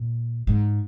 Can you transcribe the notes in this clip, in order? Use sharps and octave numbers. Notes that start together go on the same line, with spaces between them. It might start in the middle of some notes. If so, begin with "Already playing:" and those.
Already playing: A#2
G#2